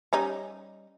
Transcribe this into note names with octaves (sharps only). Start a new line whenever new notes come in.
G3 C#4 D#4